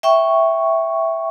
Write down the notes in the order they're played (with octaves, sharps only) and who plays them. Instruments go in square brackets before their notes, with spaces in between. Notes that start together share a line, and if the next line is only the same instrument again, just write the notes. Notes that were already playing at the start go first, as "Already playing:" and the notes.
[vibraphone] E5 G5 C#6